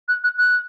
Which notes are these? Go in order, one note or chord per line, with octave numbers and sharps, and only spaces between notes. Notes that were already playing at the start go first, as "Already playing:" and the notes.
F#6
F#6
F#6